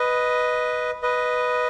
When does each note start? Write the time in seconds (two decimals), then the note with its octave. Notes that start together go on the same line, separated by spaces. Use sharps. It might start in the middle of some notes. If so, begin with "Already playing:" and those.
Already playing: B4 D#5
1.03 B4 D#5